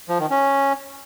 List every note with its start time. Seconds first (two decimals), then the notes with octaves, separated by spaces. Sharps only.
0.09 F3
0.20 D#3
0.30 C#4